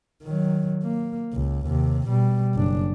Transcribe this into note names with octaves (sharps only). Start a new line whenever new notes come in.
D#3 F#3
A#3
C#2
D#2 C3
B2 G3
F#1 D4